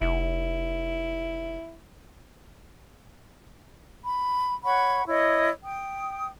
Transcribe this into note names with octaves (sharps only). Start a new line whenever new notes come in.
F1 E4
B5
C#5 F#5 B5 C#6
E4 C#5 D#5
G5 D#6